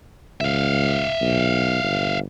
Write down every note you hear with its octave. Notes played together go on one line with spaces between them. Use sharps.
C#2 E5 F5
B1
G1